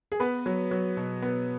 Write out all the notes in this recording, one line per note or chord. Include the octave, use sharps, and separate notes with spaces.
G#4
B3 B4
F#3
F#3
B2
B3